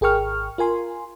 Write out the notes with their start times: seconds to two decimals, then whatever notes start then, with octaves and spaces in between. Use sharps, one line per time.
0.01 G#1 G#4 A#4 G5 C#6 F6
0.58 F4 A#4 G#5 C6